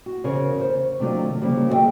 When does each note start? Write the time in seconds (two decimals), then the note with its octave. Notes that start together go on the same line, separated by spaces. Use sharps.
0.06 F#4
0.24 E2 C#3 G#4 A#4 C5 C#5
0.57 C5 C#5
1.00 C3 D#3 F#3 A3 D4 F4
1.41 C#3 F3 G3 A3 A#3
1.69 F#4 G#4 A#4 D#5 E5 G5